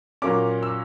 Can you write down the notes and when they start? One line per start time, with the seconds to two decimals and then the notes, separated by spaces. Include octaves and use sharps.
0.22 A#2 F#3 A#3 C#4 D6
0.63 E6